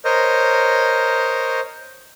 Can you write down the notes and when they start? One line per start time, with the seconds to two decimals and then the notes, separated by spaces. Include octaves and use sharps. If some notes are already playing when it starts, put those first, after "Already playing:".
0.05 A#4 C5 C#5 D#5